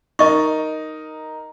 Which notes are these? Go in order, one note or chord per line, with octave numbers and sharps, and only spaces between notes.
D#4 A#4 D#5 C#6